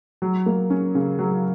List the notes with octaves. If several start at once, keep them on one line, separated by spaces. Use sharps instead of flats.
F#3
A#3
C#4
C#3
F#3